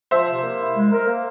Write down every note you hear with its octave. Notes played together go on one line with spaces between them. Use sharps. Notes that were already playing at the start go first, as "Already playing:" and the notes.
F3 C5 E5
C3
A#3
E4
G#3
A#4
A#3